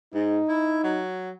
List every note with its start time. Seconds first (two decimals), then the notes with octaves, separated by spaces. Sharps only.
0.14 G#2 D#4
0.48 E4
0.83 F#3